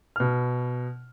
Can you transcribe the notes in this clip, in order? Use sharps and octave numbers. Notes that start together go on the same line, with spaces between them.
B2 F6